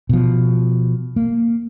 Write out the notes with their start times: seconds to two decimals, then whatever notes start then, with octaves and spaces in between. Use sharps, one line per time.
0.09 B2 F3
1.16 A#3